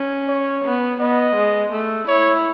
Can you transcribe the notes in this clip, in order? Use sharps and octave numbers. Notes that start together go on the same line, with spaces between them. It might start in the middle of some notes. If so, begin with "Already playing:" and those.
Already playing: C#4
C#5
B3
B3 D#5
G#3
A3
E4 C#5